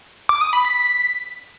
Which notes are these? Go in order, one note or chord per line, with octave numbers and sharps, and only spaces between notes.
D6
D#6
B5
B6